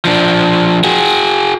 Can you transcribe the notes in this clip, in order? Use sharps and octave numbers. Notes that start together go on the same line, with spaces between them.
F3 D4
F#4 G#4